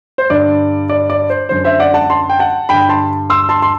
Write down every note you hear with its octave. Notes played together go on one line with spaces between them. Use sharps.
C5
G2 D3 D5
D5
D5
C5
F#2 D3 C5
C5 E5
D5 F#5
F#5 A5
A5 C6
G5
F#5 A5
G2 D3 G5 B5
A5 C6
C6 E6
A5 C6
C6